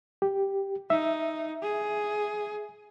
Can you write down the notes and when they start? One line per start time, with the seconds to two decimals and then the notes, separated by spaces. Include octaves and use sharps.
0.22 G4
0.90 D#4 E5
1.63 G#4